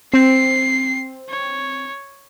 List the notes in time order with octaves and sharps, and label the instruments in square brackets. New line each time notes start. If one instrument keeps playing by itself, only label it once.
[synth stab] C4 [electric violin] C7
[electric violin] C#5